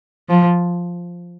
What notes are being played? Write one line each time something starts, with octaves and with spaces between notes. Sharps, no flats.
F3